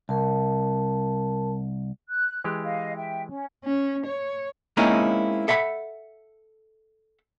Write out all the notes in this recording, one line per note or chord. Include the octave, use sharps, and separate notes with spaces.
C2 A#4 A5
F#6
E3 G#3 G4
D#5 F5
E5 G5
C#4
C#4
C#5
G#3 A#3 C4 C#4 D#4 E4
A4 E5 F#5 B5